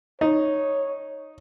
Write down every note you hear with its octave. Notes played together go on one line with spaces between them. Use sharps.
D#4 C#5